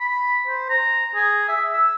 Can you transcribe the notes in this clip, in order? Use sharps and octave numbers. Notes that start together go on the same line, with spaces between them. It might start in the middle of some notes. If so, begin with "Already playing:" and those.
B5
C5
A#5
G#4
E5
E6